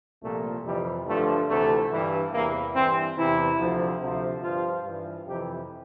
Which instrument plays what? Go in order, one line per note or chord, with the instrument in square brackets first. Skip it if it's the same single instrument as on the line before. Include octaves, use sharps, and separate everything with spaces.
[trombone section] C2 A#2 F3 A3
F2 C3 E3 G3
G2 D3 F3 A3
D2 C3 E3 A3
G2 E3
E2 C3 E3 A#3
G2 E3 C4
E2 C3 E3 E4
D2 C3 F3
D2 C3 F3
G2 F3 F4
G2 E3
F2 C3 E3 G4